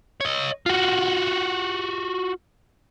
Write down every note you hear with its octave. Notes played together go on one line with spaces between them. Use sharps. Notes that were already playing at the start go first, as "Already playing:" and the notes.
C#5 D#5
F4 F#4